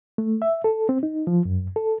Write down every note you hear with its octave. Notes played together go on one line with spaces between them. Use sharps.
A3
E5
A4
C4
D#4
F3
F#2
A4